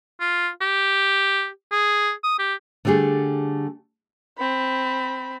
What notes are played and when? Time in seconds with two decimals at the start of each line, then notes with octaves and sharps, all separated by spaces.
0.20 F4
0.61 G4
1.72 G#4
2.24 D#6
2.39 G4
2.85 D3 G3 A3 G4 G#4
4.38 C4 B5